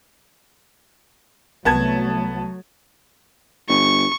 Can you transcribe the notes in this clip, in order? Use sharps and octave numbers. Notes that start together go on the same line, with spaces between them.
C2 F#3 A3 B3 A5 G#6
G1 C#6